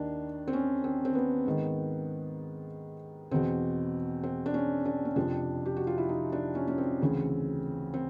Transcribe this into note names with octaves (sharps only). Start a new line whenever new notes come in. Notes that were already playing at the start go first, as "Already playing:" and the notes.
Already playing: D#2 D#3 D4
C4
C#4
C4
C4
B3
G#2 D#3
E2 B2 C4
C4
D4
C#4
D4
C#4
F2 C3 F3 D4
G4
F#4
F4
E4
D#4
D4
C#4
C#4
C4
D2 C#3 E3
C4